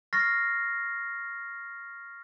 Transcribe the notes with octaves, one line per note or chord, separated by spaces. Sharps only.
C#6 F6 A6 A#6 C7